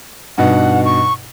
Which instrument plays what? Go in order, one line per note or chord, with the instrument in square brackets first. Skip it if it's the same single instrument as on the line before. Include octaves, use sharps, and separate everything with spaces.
[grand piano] G2 B2 D#4 [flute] F#5
[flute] C#6